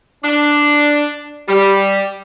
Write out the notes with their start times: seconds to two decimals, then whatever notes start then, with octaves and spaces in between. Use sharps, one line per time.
0.23 D4
1.48 G3